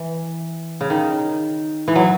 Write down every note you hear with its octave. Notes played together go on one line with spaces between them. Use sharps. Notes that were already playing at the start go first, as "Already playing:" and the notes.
Already playing: E3
C#3
D#3
E3
F#3